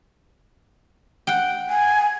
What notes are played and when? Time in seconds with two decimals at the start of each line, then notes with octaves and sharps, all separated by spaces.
1.27 F#5 G5
1.70 G#5